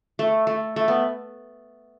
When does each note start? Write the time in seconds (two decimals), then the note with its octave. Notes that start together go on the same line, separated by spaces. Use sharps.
0.19 A3
0.47 A3
0.76 A3
0.88 B3